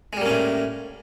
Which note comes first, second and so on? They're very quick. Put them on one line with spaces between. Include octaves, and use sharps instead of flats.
G#3 G3 A#3 C#4 A2